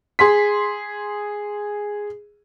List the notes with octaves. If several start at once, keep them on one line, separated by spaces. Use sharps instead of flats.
G#4 C6 B6